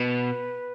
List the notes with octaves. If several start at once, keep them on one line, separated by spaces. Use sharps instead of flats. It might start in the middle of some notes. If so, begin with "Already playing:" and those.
Already playing: B2 B4